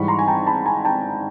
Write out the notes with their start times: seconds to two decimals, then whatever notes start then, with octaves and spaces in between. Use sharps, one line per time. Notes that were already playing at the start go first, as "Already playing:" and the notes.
Already playing: G#2 E3 G3 B5 C#6
0.08 A#5 C6
0.19 G#5
0.28 G5 A5
0.46 A5 B5
0.66 G#5 A#5
0.85 G5 A5